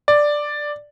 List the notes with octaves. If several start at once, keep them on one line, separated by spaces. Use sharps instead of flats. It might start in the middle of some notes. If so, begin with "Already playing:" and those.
D5